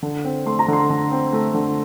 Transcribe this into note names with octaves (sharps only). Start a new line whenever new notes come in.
D3
C4
A3 C6
A#5
D3 C6
D3
C4
A3
D3